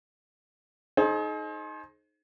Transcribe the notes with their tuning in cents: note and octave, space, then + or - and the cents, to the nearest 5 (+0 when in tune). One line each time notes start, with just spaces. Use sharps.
D#4 +0 G#4 +40 C5 +30